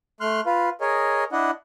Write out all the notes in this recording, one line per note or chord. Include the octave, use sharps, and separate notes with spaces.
A3 C6 F6 F#6
F4 B4 F5
G#4 A#4 C#5 D#5
D4 E4 D#5 F#5